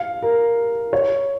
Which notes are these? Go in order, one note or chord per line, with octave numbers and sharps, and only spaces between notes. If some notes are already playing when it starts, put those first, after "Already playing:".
Already playing: F5
A#4
C#5